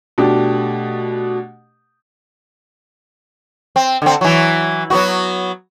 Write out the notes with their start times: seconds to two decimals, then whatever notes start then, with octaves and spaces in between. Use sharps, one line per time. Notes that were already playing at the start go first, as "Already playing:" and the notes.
0.18 B2 A3 D4 G4
3.76 C4
4.02 D3 C4
4.21 E3 F#3
4.90 F#3 B3 F#4